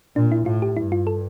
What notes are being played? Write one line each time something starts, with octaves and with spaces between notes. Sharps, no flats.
A#2 D4
E4
A2 F4
G4
G2 E4
F4
A4